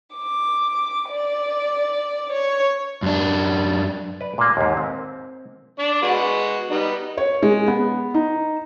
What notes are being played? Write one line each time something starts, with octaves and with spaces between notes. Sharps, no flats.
D6
D5
C#5
F#2 D4
B4 D5
A#2 A#3
D#2 G#2
C4
D4 D5
G#3 B3 F#4
G3 B3 D#4
C#5
G#3
B3
D#4